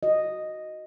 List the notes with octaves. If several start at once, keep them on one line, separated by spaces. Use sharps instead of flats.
F#4 D#5